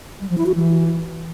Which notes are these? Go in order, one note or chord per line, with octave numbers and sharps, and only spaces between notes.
G3
F3
E4
F#4
E3